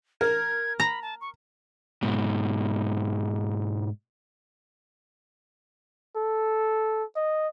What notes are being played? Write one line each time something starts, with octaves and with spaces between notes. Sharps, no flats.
A#4 G#6
A#5 B5
A5
C#6
G#2 B2
A4
D#5